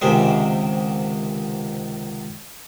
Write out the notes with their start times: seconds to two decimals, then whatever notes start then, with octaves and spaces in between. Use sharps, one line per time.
0.01 C#2 G#2 C3 D#3 G#3